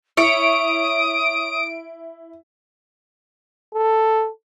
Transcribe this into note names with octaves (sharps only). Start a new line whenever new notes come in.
E4 C#5 D#6 D7
A4